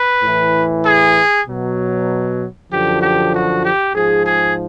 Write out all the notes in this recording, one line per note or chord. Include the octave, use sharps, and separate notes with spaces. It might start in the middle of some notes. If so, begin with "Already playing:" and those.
Already playing: B4
A2 E3
G#4
B2 F#3
F#2 D3 F3 G4
G4
F#4
G4
G#2 F3 G#4
G#4